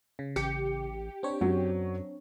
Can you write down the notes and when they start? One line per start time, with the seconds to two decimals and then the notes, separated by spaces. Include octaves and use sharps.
0.19 C#3
0.36 A1 G4 C#7
1.23 C4 D4 C#5
1.41 F#2 F#3